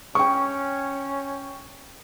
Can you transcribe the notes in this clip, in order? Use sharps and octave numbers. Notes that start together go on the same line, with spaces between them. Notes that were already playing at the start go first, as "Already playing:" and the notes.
C#4 G5 C#6